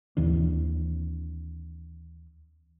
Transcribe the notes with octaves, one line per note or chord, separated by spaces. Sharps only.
D#2 E3 C4 D4